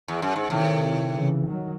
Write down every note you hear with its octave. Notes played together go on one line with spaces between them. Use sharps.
E2
F#2
G#2
A2 C3 D#3
C#3 E3
D#3 F#3